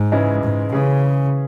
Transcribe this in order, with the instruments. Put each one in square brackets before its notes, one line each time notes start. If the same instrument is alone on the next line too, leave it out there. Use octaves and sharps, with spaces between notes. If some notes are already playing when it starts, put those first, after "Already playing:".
Already playing: [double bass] G#2
[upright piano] C#3 E3 G#3 E4
[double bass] G#2
[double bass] C#3 [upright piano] E3 C#4 G#4